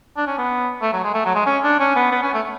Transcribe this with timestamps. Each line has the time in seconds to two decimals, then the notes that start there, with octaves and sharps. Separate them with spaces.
0.17 D4
0.27 C#4
0.38 B3
0.81 A3
0.93 F#3
1.04 G#3
1.14 A3
1.25 F#3
1.35 G#3
1.46 C#4
1.63 D4
1.80 C#4
1.96 B3
2.11 B3
2.23 C#4
2.33 A3